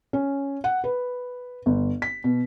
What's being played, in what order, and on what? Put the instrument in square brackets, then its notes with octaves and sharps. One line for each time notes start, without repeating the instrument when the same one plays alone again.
[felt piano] C#4
F#5
B4
G1
B6
B2